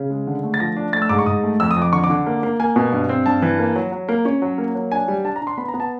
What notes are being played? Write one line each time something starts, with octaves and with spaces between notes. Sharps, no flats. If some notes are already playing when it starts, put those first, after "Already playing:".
Already playing: C#3
G#3
D3
A3
A6
F3 A#6
D4
A3 A6
E6
G#2 D6
C#6
G#2 D#6
A3
F2 E6
D#6
F2
D6
D3 C#6
D6
D3
A#3
A#3
A#3 G#5
B2
G2
C4
G2 A5
E3
A#3
F#3
F#3
A#3
C#4
F#3
A#3
F#3
D4 G#5
G3
D4 A5
A#5
D4
C6
B3 B5
A#5
B3
A5